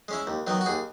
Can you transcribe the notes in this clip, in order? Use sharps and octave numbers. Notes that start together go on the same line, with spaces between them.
G#3 C#4 E4
D#2
D#3 F#3 B3
F#4
D#2 G#4